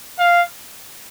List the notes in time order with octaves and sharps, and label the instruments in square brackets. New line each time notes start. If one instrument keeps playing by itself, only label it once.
[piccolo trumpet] F5